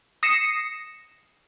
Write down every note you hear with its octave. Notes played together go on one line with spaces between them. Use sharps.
D#6 A#6 C7 C#7 E7